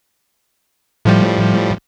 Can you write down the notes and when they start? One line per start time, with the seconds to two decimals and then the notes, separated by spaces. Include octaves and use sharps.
1.05 A2 F3 G3